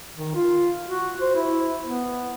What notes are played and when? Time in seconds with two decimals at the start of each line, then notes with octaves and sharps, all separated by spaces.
0.16 D#3
0.35 F4
0.86 F#4
1.21 C5
1.35 E4
1.82 B3